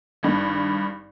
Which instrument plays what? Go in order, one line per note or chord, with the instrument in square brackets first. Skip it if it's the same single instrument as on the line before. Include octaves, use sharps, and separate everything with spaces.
[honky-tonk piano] G#1 G2